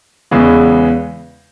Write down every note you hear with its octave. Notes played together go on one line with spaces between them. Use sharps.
E2 C#3 G#3 B3